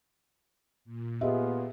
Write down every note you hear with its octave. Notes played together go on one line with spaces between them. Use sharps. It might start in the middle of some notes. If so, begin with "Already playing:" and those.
A#2
B3 F4 G4 G#4 D#5 E5